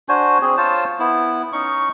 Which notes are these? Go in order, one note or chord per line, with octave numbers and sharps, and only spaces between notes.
D4 F#4 C5 G#5
C4 G#4
F4 C5 C#5 A5
B3 E4
C#4 D#4 C#6